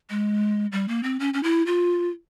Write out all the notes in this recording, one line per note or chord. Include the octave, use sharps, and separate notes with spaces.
G#3
G3
A#3
C4
C#4
C#4
E4
F4